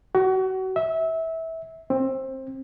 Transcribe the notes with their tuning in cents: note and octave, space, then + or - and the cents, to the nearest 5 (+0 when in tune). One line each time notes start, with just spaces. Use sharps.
F#4 +30
E5 -20
C4 +20